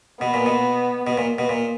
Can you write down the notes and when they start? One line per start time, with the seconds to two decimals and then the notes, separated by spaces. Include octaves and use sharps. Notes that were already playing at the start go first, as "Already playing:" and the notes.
0.21 B2 B3
0.34 A#2
0.46 B2
1.07 B2
1.17 A#2
1.38 B2
1.49 A#2